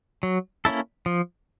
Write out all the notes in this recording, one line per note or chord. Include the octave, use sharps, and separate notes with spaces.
F#3
A#3 C#4 E4 A4
F3